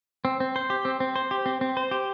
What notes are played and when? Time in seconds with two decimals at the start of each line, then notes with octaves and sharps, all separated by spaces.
0.25 C4
0.40 C4
0.56 C5
0.70 G4
0.85 C4
1.00 C4
1.16 C5
1.31 G4
1.46 C4
1.61 C4
1.77 C5
1.91 G4